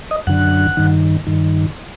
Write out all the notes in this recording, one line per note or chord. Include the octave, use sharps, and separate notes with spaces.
D#5
F#2 D3 F#5
G2 D#3
G2 D#3